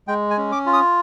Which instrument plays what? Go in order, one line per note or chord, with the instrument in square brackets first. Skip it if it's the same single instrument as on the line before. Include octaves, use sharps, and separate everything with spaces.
[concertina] G#3 G5
G#5
C#4
D6
F4
D#6